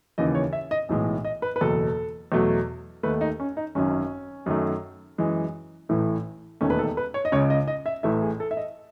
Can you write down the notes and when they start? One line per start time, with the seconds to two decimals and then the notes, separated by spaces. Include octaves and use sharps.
0.18 D#2 C#3 E3 D#5
0.35 C#5
0.53 E5
0.71 D#5
0.89 B1 A2 E3 G#3
1.25 D#5
1.42 B4
1.56 B4
1.61 F#1 E2 B2 A4
2.32 E2 B2 F#3 A3
3.03 D#2 D#3 A3 B4
3.21 D#4
3.40 C#4
3.57 D#4
3.75 G#1 F#2 D#3 C#4
4.46 F#2 D#3 F#3 A3
5.18 F#2 E3 G#3
5.89 A1 A2 E3 A3
6.61 E1 D#2 D#3 A3 C#4
6.70 B4
6.79 A4
6.97 B4
7.14 C#5
7.25 D#5
7.32 C#2 C#3 G#3 C#5
7.50 D#5
7.68 D#5
7.86 E5
8.03 A1 A2 E3 A3 E5
8.22 G#4
8.40 A4
8.51 E5
8.57 D#5